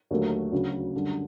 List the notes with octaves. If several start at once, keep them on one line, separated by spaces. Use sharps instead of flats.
D#2 D3 F#3 A3
D2 C#3 F#3
F#2 D3 G3